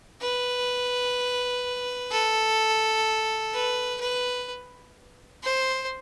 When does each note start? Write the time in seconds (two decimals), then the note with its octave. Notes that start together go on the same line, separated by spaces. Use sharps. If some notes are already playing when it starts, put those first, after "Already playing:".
0.22 B4
2.11 A4
3.53 B4
4.01 B4
5.43 C5